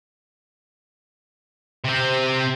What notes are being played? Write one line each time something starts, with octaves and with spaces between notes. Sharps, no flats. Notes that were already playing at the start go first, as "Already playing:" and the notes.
C3 C4